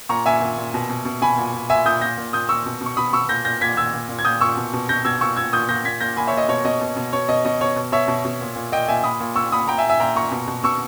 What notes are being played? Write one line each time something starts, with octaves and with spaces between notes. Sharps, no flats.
A#2 A#5 C#6
A#2 E5 G#5
A#2
A#2
B2
B2
B2
B2 G#5 B5
A#2
A#2
A#2 E5 G#5
A#2 D#6 G6
A#2 G6 A#6
A#2
A#2 D#6 G6
A#2 C#6 E6
B2
B2
C#6
B2 B5 D#6
B2 C#6 E6
A#2 G6 A#6
A#2 G6 A#6
A#2 G#6 B6
A#2 E6 G#6
A#2
A#2
G#6
A#2 D#6 G6
A#2 C#6 E6
B2
B2
B2 G6 A#6
B2 E6 G#6
A#2 C#6 E6
A#2 E6 G#6
A#2 D#6 G6
A#2 G6 A#6
A#2 G#6 B6
A#2 G6 A#6
A#2 G#5 B5
C#5 E5
A#2 D#5
B2 C#5
B2 D#5
B2
B2
B2 C#5
B2 D#5
B2 D#5
B2 C#5
B2
B2 C#5 E5
B2
B2
A#2
A#2
A#2 D#5 G5
A#2 E5 G#5
A#2 B5 D#6
A#2
A#2 C#6 E6
A#2 B5 D#6
A#2 G5 A#5
E5 G#5
A#2
E5 G#5
A#2 G5 A#5
A#2 A#5 C#6
B2
B2
B2 C#6 E6